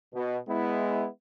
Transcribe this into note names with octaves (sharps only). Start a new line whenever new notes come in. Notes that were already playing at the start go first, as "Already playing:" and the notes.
B2
G#3 B3 E4